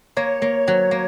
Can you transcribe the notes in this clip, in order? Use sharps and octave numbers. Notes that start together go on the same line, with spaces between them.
A#3 C#5
A#3
F#3
A#3